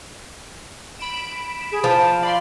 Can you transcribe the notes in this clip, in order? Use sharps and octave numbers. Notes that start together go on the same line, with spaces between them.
B5 D7 E7
G#4
F3 A5
D5 F5 B5 C6